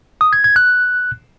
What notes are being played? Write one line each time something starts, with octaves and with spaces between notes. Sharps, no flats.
D#6
G#6
G#6
F#6